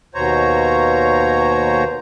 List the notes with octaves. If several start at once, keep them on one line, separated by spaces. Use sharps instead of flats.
D#2 B2 C5 C#5 A#5